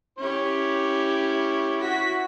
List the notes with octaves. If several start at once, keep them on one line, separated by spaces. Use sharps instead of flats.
C#4 E4 G4 C#5
F#4 B6